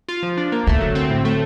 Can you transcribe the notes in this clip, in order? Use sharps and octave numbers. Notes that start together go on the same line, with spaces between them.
F4
F3
D4
A#3
D3 A3
F#3
C4
A2
A3